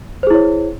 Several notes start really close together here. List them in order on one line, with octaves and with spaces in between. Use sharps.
C5 G#4 E4 C#5